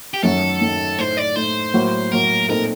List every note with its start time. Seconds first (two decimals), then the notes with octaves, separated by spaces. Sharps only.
0.14 G4
0.23 F#2 D#3 F#3 A3 A4
0.61 F#2 D#3 F#3 A3
0.99 A2 A3 D#4 C5
1.17 D5
1.36 A2 A3 D#4 C5
1.74 A2 F#3 A#3 F#4
2.12 A2 F#3 A#3 F#4 A#4
2.49 A#2 A3 C4 D#4 A4 A#4